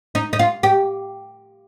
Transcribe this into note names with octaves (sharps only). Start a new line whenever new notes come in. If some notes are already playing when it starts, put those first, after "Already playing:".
D#4
D#4
F4
G4